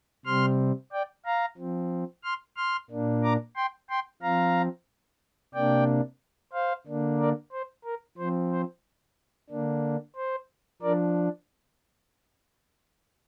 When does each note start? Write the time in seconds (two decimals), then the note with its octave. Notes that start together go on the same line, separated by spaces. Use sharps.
0.25 C3 G3 C4 C6 F6
0.92 D5 G5
1.25 F5 A#5
1.58 F3 C4
2.24 C6 F6
2.57 C6 F6
2.90 A#2 A#3 D4
3.23 A#5 D6
3.56 G5 C6
3.89 G5 C6
4.22 F3 C4 F5 A#5
5.54 C3 A#3 D4 D5 G5
6.53 C5 F5
6.86 D3 A#3 D4
7.19 A#4 D5
7.52 C5
7.84 A#4
8.18 F3 C4 C5
8.51 C5
9.50 D3 A#3 D4
10.16 C5
10.82 F3 D4 A#4 D5